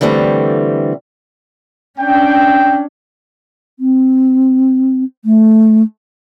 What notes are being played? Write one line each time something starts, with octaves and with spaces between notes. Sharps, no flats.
D3 E3 G3 A3 C4
C#4 D4 G5
C4
A3